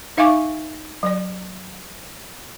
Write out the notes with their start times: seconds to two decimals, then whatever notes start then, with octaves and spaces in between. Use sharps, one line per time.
0.17 D#4 E5 F5 G#5 C#6 D6
1.03 F#3 D5